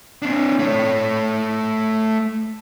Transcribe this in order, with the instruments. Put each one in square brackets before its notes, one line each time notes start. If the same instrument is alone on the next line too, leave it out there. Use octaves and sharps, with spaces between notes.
[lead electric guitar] C4 D4
A3 C#5